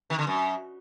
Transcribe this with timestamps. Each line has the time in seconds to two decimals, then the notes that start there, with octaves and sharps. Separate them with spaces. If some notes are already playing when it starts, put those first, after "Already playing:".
0.10 D#3
0.19 D3
0.27 F#2